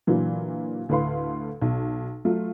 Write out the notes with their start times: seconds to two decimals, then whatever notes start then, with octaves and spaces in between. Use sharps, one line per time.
0.07 A#2 D3 E3 F#3
0.89 D2 A2 B4 F5 C6
1.62 B1
2.25 F#3 A3 F4